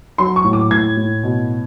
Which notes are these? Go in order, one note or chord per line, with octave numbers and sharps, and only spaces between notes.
F#3 C6
C#6
A2
D6
A2 G#6
A2
B2